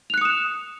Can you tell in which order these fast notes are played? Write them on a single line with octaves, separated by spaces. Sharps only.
F7 F#6 C#7 D#6 E7